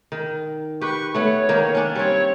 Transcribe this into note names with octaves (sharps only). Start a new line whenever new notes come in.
D#3
G4 B4 C#6
A3 B3 C#5
D#3 A#3
C#4 D4
G3 C4 C#5